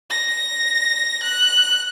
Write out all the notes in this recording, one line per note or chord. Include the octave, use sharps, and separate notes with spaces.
A#6
F#6